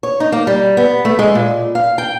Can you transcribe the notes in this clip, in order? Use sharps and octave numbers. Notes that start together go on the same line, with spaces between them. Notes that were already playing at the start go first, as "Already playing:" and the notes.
C#5
D#4
A#3
G3
B3
A3
G#3
A#2
F5
G5